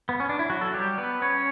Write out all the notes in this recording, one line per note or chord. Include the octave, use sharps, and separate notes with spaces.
B3
C#4
D4
E4
F#3 F#4
A4
G3 G4
B3 B4
C#4 C#5